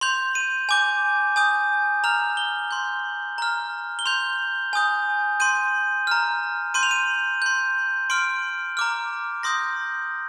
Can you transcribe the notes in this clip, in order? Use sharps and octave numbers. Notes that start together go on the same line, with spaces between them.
C6 G6 F7
D#7
G#5 D6 G6
G#5 D#6 G6
A#5 F6 F7
G7
C6 G6
A#5 F6
G7
C6 G6 F7
G#5 D#6 G6
C6 G6 D#7
A#5 F6
C6 G6 D#7
F7
D#7
C6 G6
C6 F6 D7
A#5 D6 F6
C6 D#6 G6 A#6